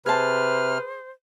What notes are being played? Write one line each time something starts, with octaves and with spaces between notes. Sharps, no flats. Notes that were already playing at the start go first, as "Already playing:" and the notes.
C3 G#4 B4 C5 A5 F6